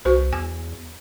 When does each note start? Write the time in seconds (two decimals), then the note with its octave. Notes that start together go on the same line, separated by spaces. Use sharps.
0.05 C2 F#4 B4 C5
0.33 E2 G#5